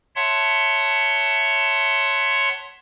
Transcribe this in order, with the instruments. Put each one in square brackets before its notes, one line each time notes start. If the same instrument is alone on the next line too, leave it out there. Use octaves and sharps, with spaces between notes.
[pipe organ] C#5 E5 F#5 A5 C6